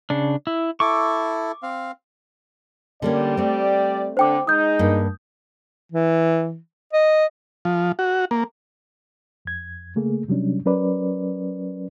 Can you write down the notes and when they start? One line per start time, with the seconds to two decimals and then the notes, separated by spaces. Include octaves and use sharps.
0.10 C#3 D4
0.47 E4
0.80 E4 A4 C#6 D6
1.63 C4 F5
3.02 D3 G3 A#3 C#4 D5
3.37 A3 C4
4.17 D3 D4 C5 G5 D6
4.47 G#3 D#4 D#6 G6
4.79 G2 A#3
5.92 E3
6.93 D#5
7.65 F3
7.99 F#4
8.31 A#3
9.45 F2 G#6
9.96 C#3 A3 A#3 G#4
10.28 C3 F#3 G3 C#4 D4
10.65 F#3 C#4 A#4 B4 D5